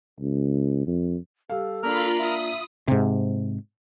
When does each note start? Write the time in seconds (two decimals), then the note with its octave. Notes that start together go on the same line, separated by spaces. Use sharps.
0.20 C#2
0.87 F2
1.50 G3 A4 F5
1.83 A#3 D4 F4 A#4 B5 F6
2.18 E5 D#6
2.88 G#2 C3